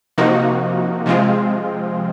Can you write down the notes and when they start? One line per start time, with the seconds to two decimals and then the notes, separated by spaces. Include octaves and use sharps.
0.18 C3 F3 A#3 D#4 F#4
1.06 C3 F3 G#3 C4 F4